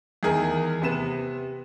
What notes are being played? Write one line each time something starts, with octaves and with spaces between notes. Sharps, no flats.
E2 D#3 G#4 A#4
C3 B3 E7